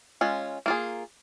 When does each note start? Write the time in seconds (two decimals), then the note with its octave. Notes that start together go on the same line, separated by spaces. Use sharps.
0.21 G#3 C#4 F4
0.66 A#3 F4 G#4